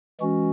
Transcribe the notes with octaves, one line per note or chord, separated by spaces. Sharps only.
E3 G#3 C#4 F#4